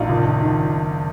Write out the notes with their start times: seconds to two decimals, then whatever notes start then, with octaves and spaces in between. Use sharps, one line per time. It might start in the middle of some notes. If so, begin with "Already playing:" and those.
Already playing: A#1 D#4 F4
0.09 F#1
0.25 D#3
0.41 D#3